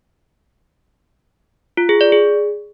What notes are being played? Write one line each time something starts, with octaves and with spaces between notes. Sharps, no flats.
F4
G#4
D5
G#4